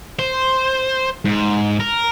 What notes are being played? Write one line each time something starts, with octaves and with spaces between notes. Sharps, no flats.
C5
G#2
A#4